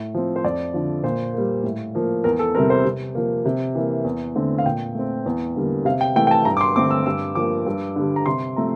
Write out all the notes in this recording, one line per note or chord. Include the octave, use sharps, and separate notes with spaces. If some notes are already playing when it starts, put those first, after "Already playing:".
Already playing: A2
F3 C4
C5
F2 D5
D3 F3
A#2 C5
G3 A#3
A2
F3 A#3
E2 A#4
A4
C3 G3 C4 A#4
C5
C3
F3 A#3
C3
E3 A#3
E2
D3 A3 C4
F5
A#2 G5
A3 C4
E2
D3 G3 A#3
C3 F5
G5
E3 A3 G5
G5
A5
G2 A#5
D6
C6
D3 A3 C4 D6
E6
G2 E6
F3 A#3 D6
G2
D3 G3
A#5
C3 C6
F3 A3 C4 A#5